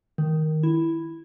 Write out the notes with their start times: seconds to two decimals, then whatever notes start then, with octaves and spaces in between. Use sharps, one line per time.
0.18 D#3
0.63 E4